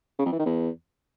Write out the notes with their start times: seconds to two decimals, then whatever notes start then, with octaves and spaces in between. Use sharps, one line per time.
0.19 C#3
0.25 F2
0.32 E3
0.39 D#3
0.46 E2